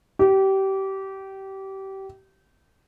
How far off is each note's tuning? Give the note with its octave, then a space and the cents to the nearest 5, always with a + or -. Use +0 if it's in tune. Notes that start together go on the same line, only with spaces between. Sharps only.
G4 -25